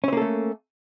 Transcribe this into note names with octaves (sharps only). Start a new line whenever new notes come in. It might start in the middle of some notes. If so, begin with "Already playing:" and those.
A3 A#3 C4 C#4 A4